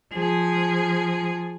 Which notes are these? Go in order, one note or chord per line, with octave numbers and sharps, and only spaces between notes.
F3 G#4